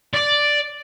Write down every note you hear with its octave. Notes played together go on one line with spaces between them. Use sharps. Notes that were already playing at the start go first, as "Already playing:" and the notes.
D5